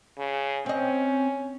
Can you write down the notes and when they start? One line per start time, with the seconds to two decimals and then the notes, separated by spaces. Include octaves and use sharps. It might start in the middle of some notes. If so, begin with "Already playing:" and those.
0.18 C#3
0.66 C4 C#4 D#5